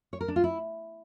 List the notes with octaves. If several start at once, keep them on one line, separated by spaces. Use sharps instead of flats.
C#5
A#4
D4
F4
E4